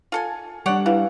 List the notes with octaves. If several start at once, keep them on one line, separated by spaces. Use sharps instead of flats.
F4 A4 G#5
G3 D4 C#5 D5 F#5
E3 E4 B4 F5